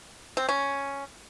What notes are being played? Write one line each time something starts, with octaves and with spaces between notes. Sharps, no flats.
C4
C#4